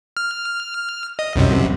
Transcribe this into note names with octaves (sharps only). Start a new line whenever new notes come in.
F6
D#5
C2 F#2 C3